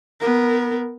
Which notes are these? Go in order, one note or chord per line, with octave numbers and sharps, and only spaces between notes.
B3 A#4